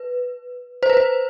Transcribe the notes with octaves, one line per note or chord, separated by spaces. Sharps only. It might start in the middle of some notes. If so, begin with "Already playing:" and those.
Already playing: B4
C5
B4
C5